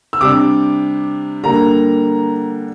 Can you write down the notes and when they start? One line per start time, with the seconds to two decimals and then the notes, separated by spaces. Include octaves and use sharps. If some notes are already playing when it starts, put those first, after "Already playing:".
0.13 E6
0.21 C3 G3 D4 D6
1.44 D3 G3 A#3 D4 A#5